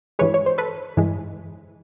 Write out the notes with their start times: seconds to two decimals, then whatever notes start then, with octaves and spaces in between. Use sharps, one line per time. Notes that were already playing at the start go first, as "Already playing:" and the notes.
0.19 G2 E3 G#3 B4 C#5
0.34 C#5
0.46 C5
0.58 A4 B4
0.97 G2 E3 G#3